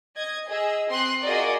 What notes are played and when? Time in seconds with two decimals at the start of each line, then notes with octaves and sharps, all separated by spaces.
0.16 D#5 G#6
0.48 G#4 D#5 E6
0.89 C4 C6 D#6 F#6
1.24 F4 F#4 G#4 A#4 D5 D#5